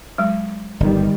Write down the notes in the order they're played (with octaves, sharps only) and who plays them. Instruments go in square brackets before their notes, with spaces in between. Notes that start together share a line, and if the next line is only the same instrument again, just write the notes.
[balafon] F#3 G#3
[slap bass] G1 [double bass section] D#3 G3